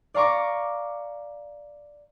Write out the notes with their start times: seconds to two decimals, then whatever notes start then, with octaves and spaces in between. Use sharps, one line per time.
0.14 D5 F5 A#5 C#6 D6